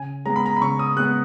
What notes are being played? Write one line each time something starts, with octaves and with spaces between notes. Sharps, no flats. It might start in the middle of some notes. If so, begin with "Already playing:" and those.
Already playing: C#3 G#5
G#3 B3 A#5
B5
A#5
B5
C#3 C#6
D#6
G#3 B3 F#6